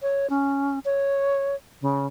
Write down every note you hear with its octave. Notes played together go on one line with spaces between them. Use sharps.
C#5
C#4
C#5
C#3